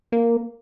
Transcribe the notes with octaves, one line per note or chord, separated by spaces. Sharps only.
A#3